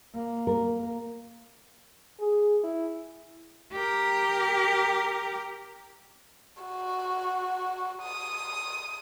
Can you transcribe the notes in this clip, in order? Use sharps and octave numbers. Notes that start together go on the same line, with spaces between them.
A#3
A#4
G#4
E4
G4 A#4
F#4
D#6